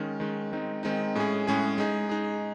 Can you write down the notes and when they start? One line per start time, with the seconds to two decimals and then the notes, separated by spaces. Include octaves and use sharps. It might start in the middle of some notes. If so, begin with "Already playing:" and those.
Already playing: D#3 G#3 C#4
0.20 D#3 G#3 C#4
0.51 D#3 G#3 C4 D#4
0.83 D#3 G#3 C4 D#4
1.15 A2 G#3 C#4 G#4
1.47 A2 G#3 C#4 G#4
1.78 G#3 D#4 G#4
2.09 G#3 D#4 G#4